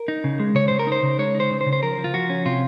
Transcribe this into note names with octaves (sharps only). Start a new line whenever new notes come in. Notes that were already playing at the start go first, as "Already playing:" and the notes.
Already playing: A#4
D#4
C#3
G#3
C#3 C#5
C#3 C5
A#4
D#4 C5
C#3
G#3 C#5
D#4
C5
C#3
C5
C#3
C5
F3 A#4
F3
F4
F3 F#4
C#4
C3 F4